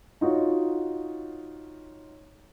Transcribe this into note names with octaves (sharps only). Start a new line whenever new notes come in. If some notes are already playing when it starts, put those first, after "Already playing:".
D#4 F4 F#4 C#5